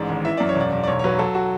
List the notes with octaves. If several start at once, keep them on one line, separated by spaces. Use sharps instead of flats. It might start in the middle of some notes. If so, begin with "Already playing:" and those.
Already playing: A1 G#2 D5
G#1
E3 E5
F#2 D5
C#5
E1 D5
E1
D5
B1 C#5
C#5
F#3 B4
F#3 A4
F#4